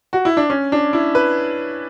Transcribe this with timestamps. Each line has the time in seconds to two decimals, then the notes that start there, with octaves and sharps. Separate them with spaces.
0.13 F#4
0.25 E4
0.37 D4
0.50 C#4
0.72 D4
0.93 E4
1.15 B4